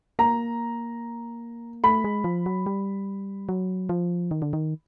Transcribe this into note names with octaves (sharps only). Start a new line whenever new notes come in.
A#3 A#5
A3 B5
G#3
F3
F#3
G3
F#3
F3
D#3
D3
D#3